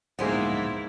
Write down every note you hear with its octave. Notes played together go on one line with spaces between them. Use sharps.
D1 A#1 G#2 G#3 A#3 B3 E4 C5